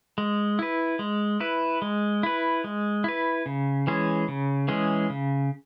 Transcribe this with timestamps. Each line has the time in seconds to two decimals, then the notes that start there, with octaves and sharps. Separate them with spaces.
0.18 G#3
0.59 E4 B4
0.99 G#3
1.40 E4 B4
1.82 G#3
2.23 E4 B4
2.64 G#3
3.04 E4 B4
3.46 C#3
3.87 E3 G#3 C#4 G#4
4.28 C#3
4.68 E3 G#3 C#4 G#4
5.10 C#3